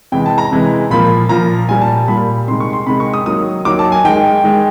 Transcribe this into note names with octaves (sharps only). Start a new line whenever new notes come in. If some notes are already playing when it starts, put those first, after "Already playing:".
C3 E3 G#3 G5
A5
A#5
C3 E3 G#3
A#2 F3 A#3 B5
A#2 F3 A#3 A#5
A#2 G3 A#3 G#5
A5
A5
A#2 G3 A#3 B5
C3 D#3 G#3 C6
C#6
C6
C3 D#3 G#3 B5
C#6
D#6
D#3 F#3 A#3 D#6
D#3 F#3 A#3 D6
A5
G#5
D#3 G#3 G5
D#3 G#3